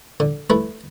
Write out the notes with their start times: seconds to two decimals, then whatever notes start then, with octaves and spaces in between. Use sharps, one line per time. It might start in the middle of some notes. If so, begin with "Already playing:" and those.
0.20 D3
0.50 A3 E4 B4